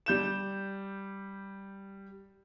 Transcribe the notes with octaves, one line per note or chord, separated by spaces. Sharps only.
G3 G6 E7